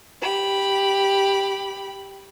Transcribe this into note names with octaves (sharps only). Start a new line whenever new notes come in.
G4 B5